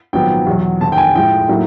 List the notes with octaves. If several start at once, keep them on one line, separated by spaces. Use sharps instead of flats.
A#1 G#2 D#3 F#3 B3 G5
E2 B2 F#3
F1 D#2 D#3 A5
G5
G#5
A2 F3 G#3 G5
A2 F#3 A#3 D#4